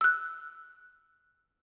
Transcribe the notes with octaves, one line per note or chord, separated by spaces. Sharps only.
E6 F#6